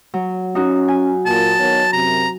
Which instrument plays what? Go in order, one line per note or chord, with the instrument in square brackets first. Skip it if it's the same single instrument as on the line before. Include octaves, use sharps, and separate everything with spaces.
[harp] F#3
[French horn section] C#4 [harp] D#4 F#4
[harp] G#5
[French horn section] A#2 [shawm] A5
[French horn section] D#3 B3 C#5
[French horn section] F#2 C3 [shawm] A#5